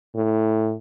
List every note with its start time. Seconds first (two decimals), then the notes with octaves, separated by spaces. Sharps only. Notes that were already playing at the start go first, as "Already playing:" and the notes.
0.16 A2